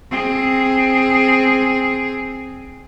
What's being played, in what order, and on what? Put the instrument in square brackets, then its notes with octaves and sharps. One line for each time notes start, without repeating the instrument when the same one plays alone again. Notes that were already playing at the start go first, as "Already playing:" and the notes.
[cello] C4 G#4